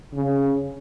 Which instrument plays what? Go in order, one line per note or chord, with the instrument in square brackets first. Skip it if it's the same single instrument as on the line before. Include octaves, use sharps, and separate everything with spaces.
[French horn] C#3